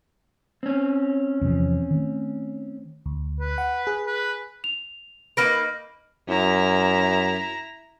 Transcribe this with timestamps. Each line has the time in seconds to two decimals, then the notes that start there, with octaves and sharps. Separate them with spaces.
0.63 C4 C#4
1.41 E2 C3 F3
1.91 D#3 A3
3.06 D2
3.40 B4
3.58 F#5
3.87 G#4
4.06 B4
4.64 F7
5.37 A#3 D#4 B4 F6 A#6 D7
6.28 F#2 E4 A#5